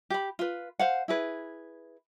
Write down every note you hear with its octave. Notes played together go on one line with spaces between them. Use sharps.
G4 B5
F4 B4
C5 F5 F#5
E4 G#4 B4